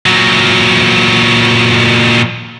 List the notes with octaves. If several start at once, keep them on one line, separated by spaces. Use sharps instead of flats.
A#2 F#3